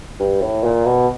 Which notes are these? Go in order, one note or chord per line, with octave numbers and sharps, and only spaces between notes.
G2
A2
A#2
B2